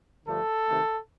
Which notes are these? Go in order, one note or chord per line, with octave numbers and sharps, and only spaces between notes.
G2 D3 F3 A3 A4
C3 D#3 A3